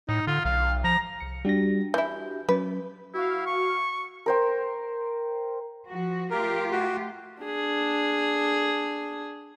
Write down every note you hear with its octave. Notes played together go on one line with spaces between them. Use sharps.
A2 D#4
D3 F4
B1 F5
F3 A#5
C2 C#7
G3 D4 F#4 G4 A#6
E3 E4 G6
F#3 C#4 B4
E4 F#4 F5
C#6
A#4 C5 G5
F3 F#4
A3 F4 G4 A#4
F#4
D4 G#4